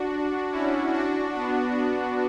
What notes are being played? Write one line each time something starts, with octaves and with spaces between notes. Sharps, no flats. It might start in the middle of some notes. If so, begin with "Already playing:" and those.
Already playing: D4 F#4
C#4 E4
D4 F#4
B3 D4